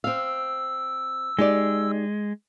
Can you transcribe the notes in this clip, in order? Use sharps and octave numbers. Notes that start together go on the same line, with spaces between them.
C4 F5 E6
G#3 D#4 G4 D5